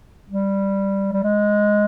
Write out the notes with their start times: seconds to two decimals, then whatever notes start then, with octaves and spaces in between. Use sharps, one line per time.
0.29 G3
1.12 G3
1.24 G#3